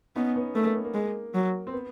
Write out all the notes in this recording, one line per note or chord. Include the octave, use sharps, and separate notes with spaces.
B3 C#4 D#4
B3 C#4
A3 A#3
B3
B3
A#3
G#3
F#3
C4
B3